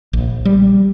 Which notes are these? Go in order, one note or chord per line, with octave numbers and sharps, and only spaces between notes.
A#1
G3